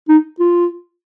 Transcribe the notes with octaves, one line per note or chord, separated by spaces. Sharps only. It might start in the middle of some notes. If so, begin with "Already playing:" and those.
D#4
F4